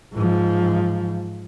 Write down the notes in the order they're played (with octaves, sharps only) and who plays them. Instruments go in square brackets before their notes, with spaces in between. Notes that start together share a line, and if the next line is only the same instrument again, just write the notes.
[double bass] G#2 F3